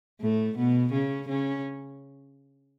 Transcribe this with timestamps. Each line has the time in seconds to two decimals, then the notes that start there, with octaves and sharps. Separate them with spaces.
0.21 A2 A3
0.57 B2 B3
0.92 C#3 C#4
1.28 C#3 C#4